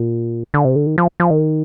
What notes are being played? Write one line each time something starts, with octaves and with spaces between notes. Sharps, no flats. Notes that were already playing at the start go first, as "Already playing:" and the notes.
Already playing: A#2
D3
C3
D3
D#3
F3
F3
D#3